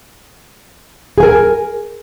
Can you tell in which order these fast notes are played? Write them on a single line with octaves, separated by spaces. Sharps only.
G#4 G#5 A#4